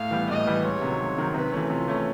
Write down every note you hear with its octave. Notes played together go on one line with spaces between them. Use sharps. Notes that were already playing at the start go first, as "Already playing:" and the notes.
Already playing: A2 F5
E3 G3 B3
A2 D#5
E3 G3 B3
C#2 C#5
C3 D#3 F#3
C#2
C3 D#3 F#3
C3 B4
E3 A3 C#4
C3 F4
E3 A3 C#4